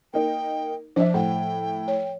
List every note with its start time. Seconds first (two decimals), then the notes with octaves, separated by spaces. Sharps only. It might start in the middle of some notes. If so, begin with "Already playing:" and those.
0.14 A#3 D#4 G5
0.96 F3 D4 C5 E5
1.14 A2 F#5 G5
1.88 C#5